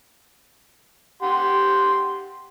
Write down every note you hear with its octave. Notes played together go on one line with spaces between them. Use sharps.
G4 F#5 C6